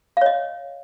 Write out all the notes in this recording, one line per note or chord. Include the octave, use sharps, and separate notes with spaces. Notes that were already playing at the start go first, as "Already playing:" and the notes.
C#5 D#5 F5